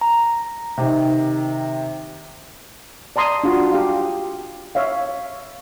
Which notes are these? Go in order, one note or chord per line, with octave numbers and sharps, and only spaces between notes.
A#5
C3 D#3
D5 A5 A#5 C6 D#6
D4 F4 F#4
G4 F5
C#5 E5 F5